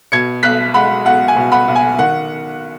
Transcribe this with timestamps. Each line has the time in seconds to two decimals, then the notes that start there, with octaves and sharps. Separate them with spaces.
0.12 B2 G#6 C#7
0.43 B1 F#6 B6
0.74 G#3 F#5 B5
1.05 B1 F#5
1.28 G#5
1.36 B2
1.52 F#5 B5
1.68 B1
1.75 G#5
1.99 D#3 F#5